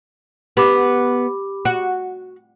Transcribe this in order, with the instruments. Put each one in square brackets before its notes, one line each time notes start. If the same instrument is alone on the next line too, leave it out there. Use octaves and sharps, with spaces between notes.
[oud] B3 [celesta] G4 B5 D6
[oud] F#4